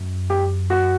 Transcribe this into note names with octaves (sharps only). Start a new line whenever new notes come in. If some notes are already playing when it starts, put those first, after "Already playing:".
Already playing: F#2
G4
F#4